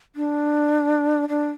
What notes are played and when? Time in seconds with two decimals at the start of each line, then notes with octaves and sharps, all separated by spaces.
0.16 D4
1.29 D4